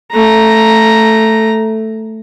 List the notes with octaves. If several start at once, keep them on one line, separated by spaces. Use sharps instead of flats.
A3 A#5